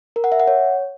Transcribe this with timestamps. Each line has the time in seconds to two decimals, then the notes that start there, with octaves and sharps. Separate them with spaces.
0.16 A#4
0.24 F#5
0.32 E5
0.40 F#5
0.47 C#5